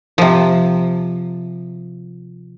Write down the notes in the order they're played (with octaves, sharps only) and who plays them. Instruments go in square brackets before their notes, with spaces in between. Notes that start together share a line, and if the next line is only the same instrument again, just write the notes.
[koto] C3 F3